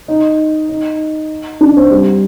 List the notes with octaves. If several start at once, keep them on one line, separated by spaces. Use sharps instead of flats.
D#4
D#4
D4
C4
G3